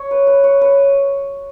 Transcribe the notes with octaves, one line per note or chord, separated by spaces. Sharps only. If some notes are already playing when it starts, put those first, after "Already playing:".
Already playing: C#5
B4
B4
C#5
B4